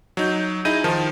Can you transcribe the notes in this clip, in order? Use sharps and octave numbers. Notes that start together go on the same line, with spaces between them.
F#3 D#4 G6
D#4 E4 G#4 D#5 G6 D#7
D#3 F3 A5